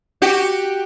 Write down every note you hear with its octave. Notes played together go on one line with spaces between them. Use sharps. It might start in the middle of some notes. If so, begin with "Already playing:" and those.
F#4 G4